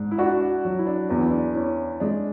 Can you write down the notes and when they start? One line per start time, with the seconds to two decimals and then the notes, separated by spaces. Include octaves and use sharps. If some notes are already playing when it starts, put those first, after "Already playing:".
Already playing: G#2 D4
0.11 E4
0.18 D4 F#4
0.41 D4
0.65 F#3
0.79 E4
0.87 D4
1.09 E2 D4
1.20 E4
1.31 D4
1.55 C#4 E4
2.00 G#3 D4